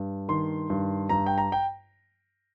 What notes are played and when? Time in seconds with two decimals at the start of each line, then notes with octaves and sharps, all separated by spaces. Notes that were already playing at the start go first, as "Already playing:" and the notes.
Already playing: G2
0.28 D#3 C6
0.70 G2
1.09 G2 A#5
1.26 G5
1.38 A#5
1.52 G5